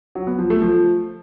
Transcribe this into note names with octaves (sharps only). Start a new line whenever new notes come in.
F#3
B3
F3
A3
F3